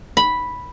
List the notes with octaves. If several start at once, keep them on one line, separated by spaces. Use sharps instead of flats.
B5